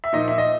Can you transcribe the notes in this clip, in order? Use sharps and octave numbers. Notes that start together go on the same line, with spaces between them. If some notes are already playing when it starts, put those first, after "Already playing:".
E5
A#2 F3 D#4 D#5
E5
D#5